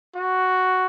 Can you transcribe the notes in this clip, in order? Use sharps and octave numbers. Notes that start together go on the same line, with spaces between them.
F#4